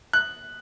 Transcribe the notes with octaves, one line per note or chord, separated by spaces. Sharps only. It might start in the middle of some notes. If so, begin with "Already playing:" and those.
F#6